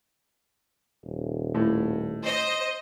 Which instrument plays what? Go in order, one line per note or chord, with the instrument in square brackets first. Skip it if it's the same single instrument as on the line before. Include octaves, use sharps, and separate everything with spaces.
[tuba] D#1
[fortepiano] A2
[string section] C5 D#5